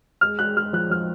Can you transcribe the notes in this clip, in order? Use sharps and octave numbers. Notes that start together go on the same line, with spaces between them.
G#3 F6
G#3 F#6
G#3 F6
F3 F#6
F3 F6